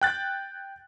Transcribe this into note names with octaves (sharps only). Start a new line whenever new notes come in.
G5 F#6 A6